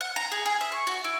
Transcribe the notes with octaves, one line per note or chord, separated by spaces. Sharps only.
F#5
A#5
G#4
G#4
E5
C#6
F#4
E4